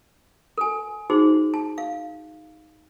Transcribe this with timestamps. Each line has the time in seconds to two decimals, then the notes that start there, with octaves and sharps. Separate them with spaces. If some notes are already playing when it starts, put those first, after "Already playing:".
0.58 A4 G#5
1.10 D#4 F#4 G#4 C5
1.54 A5
1.78 F5